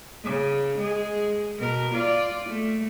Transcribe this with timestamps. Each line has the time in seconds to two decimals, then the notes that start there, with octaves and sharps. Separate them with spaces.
0.24 C#3
0.78 G#3 G#4
1.59 B2 A#4
1.94 F4 D5
2.49 A3